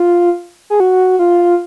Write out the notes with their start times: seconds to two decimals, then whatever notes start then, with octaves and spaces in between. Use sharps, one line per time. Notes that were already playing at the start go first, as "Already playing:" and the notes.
Already playing: F4
0.70 G#4
0.80 F#4
1.19 F4